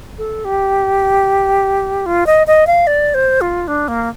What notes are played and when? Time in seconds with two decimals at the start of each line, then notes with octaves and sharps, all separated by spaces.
0.18 A4
0.45 G4
2.06 F4
2.27 D#5
2.47 D#5
2.67 F5
2.87 D5
3.14 C5
3.41 F4
3.68 D4
3.88 A#3